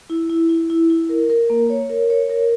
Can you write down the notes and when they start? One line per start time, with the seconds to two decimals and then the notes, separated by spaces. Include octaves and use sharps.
0.10 E4
0.29 E4
0.49 E4
0.70 E4
0.90 E4
1.09 A#4
1.30 A#4
1.50 A#3
1.70 C#5
1.90 A#4
2.10 C#5
2.30 A#4